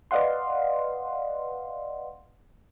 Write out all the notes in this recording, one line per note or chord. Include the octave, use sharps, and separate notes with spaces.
B4 D5 D#5 F5 F#5 C6